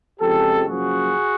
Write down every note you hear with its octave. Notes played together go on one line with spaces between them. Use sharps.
F2 C#3 F3 G#3 G4 A4
F#2 C#3 F3 A#3 F#4 G#4